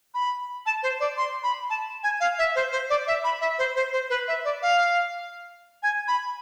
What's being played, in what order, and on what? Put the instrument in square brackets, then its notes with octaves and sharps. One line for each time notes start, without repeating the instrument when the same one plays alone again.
[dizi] B5
A5
C5
D5
C6
B5
A5
G#5
F5
E5
C5
C5
D5
E5
B5
E5
C5
C5
C5
B4
E5
D5
F5
G#5
B5